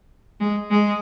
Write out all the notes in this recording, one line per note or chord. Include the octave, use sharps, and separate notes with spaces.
G#3
G#3